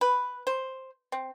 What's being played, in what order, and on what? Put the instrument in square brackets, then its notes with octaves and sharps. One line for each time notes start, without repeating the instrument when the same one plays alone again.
[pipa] B4
C5
C4